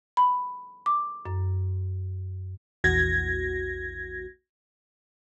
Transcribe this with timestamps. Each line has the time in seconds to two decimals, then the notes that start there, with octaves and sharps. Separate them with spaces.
0.17 B5
0.86 D6
1.25 F#2
2.84 A#1 E2 F#4 G#6 A#6